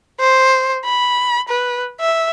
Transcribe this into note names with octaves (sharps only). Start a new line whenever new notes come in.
C5
B5
B4
E5